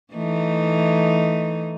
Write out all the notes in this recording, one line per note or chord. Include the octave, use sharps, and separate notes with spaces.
E3 A3 D#4